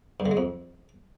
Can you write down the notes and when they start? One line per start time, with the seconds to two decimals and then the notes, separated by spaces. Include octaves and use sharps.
0.20 G2
0.26 D3
0.31 G#3
0.37 F2